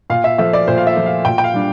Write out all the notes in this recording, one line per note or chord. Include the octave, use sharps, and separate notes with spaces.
A#2 F5
E5
F3 A3 E5
D5
A#2 C5
F5
E5
F3 A3
F5
A#2 G5
G5
F5
G3 D4